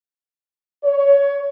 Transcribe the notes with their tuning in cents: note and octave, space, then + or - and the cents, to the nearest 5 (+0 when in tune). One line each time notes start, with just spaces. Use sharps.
C#5 +20